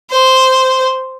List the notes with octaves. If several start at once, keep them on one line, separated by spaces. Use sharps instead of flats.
C5